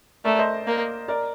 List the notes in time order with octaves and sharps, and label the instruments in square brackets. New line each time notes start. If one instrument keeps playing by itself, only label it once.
[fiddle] A3 [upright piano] A#4 D5
[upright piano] C5 D#5
[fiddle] A#3
[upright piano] A#4 D5